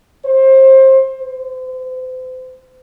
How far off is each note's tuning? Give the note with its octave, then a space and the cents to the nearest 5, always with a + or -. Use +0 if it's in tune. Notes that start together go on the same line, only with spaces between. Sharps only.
C5 +25
C5 -35